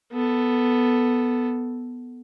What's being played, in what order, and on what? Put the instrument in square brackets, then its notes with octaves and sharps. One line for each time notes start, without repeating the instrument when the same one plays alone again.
[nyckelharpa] B3 A4